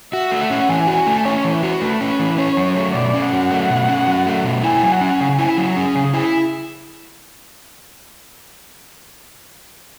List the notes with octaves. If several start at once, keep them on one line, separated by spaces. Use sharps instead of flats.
F#4 E5
A3
F#5
C#4
E3 G#5
F#4
G#5
A3
C#4 C#5
E3
B4
F#4
A3 B4
C#4
B4
E3
C#4 C#5
F#3
A3
B2 D5
C#4
F#5
F#3
A3
B2
C#4
F#3
A3
B2
E4 G#5
F#3
F#5
C#4
C#3 G#5
E4
F#3
C#4 G#4
C#3
E4